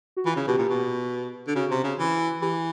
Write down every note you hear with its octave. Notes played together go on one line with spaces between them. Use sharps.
F#4
E3 F4
C#3
B2 G4
A#2
B2
D3
C#3 F#4
C3
C#3
E3
E3 G4